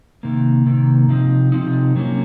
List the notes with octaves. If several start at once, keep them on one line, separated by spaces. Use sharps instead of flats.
C3 D#3 A#3
C3 D#3 A#3
C3 F3 C4 D#4
C3 F3 C4 D#4
C3 F#3 A#3 C#4